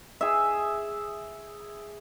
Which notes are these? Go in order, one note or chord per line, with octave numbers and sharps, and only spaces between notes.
G#4 E5